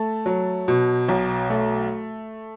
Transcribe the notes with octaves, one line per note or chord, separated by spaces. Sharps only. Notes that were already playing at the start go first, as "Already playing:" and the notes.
Already playing: A3 A5
F#3
B2
B1
A3